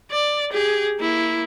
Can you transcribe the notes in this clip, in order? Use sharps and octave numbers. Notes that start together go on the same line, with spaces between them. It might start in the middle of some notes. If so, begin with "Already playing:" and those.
D5
G4 G#4
A#3 E4